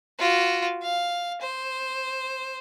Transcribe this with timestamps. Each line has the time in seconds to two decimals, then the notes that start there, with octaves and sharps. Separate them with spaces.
0.19 F4 F#4
0.82 F5
1.41 C5